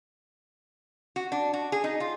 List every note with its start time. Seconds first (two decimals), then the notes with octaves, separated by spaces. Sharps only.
1.16 F#4
1.32 D4
1.54 F#4
1.72 G#4
1.84 D#4
2.00 F4